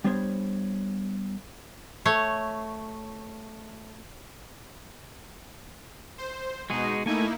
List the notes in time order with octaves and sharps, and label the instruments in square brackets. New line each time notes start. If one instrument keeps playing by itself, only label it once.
[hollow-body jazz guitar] G3 B3 D4 C5 C#5
[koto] A3 C#5
[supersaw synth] C5
[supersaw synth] B2 D#4 [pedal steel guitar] G#3 F#4 G#4
[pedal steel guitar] A3 G#5 [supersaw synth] A#3 D#4 E4